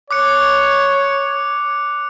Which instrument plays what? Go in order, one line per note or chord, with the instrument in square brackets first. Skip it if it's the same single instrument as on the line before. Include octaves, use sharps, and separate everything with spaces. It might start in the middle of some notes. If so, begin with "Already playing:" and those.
[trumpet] C#5 [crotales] D6 F#6 C#7